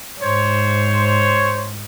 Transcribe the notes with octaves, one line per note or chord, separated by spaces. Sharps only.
G#2 C5 C#5